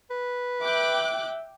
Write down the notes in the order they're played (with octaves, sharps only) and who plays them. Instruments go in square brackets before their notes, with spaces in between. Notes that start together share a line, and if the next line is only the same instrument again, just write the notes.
[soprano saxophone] B4
[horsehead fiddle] E5 [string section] G5 D6 F#6